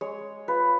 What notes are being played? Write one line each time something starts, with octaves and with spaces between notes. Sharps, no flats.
G#3 C#5
F4 B4